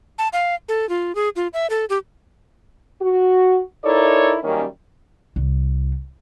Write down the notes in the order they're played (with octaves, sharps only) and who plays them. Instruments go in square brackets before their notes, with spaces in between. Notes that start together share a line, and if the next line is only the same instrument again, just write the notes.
[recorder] A5
F5
A4
F4
G#4
F4
E5
A4
G4
[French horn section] F#4
D#4 E4 A4 A#4 C#5 D5
F#2 D#3 G3 A#3 C#4
[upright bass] C2